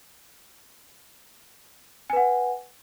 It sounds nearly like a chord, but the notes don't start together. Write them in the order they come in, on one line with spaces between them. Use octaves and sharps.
G#5 B4 F#5